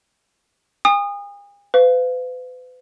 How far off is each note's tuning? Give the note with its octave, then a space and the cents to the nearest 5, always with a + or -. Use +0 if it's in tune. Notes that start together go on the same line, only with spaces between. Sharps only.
G#5 -45 D#6 -20
B4 +40 F5 +0